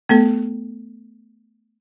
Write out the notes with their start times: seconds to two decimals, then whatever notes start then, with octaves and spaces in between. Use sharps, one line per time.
0.09 A3 B3 A4